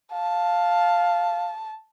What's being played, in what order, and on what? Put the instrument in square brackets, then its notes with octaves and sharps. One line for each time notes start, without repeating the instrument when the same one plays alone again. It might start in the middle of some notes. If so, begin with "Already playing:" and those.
[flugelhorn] F5 [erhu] A5